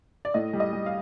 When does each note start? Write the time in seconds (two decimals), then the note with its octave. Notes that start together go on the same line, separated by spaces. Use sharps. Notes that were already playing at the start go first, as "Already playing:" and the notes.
0.25 D5
0.34 A2 D#5
0.53 G3
0.60 D#5
0.73 G3
0.86 F5